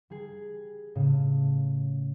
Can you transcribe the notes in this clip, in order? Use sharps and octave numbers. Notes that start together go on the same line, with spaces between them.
G3 G#4
A2 C#3